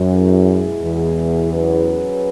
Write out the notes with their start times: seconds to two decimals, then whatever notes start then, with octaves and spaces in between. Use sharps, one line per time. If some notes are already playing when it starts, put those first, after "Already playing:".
Already playing: F#2
0.12 B2 G#3 E4 G#4
0.82 E2
1.51 F#3 C#4 G#4 B4